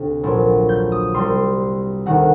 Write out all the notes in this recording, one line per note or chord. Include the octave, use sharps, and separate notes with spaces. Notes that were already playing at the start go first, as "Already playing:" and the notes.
Already playing: D2 C3
A#1 A#2 F#3
G6
D#6
C2 C3 G3 C6
D2 C3 D#3 F#5